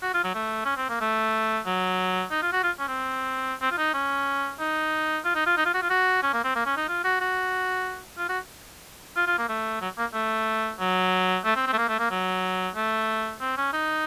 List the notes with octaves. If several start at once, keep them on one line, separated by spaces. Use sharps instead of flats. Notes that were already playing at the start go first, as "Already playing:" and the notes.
F#4
F4
F#3
A3
C#4
C4
A#3
A3
F#3
D#4
F4
F#4
F4
C#4
C4
C4
F4
D#4
C#4
D#4
F4
D#4
F4
D#4
F4
F#4
F4
F#4
C#4
A#3
C4
A#3
C#4
D#4
F4
F#4
F#4
F4
F#4
F4
F4
A#3
A3
F#3
A#3
A3
F#3
A3
C4
C4
A3
A#3
A3
A#3
F#3
A3
C4
C#4
D#4